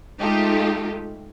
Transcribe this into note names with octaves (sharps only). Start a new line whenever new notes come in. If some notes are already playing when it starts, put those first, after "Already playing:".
G#3 A3 D#4 F4 G4 A4